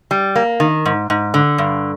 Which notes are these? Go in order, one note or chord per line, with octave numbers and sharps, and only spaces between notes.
G3
A#3
D#3
G#2
G#2
D3
G2